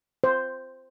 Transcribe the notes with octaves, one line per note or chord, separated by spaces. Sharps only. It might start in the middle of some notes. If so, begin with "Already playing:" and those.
C5